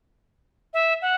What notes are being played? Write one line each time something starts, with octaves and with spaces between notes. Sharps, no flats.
E5
F#5